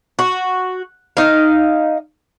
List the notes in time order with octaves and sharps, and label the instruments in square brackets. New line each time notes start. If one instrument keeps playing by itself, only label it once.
[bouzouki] F#4
D#4 F5